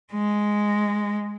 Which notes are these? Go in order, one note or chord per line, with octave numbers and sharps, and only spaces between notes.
G#3